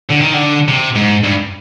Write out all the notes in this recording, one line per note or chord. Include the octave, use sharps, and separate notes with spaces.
D3
D#3
D3
C3
G#2
G2